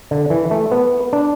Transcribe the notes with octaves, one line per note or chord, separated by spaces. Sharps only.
D3
E3
A3
B3
D4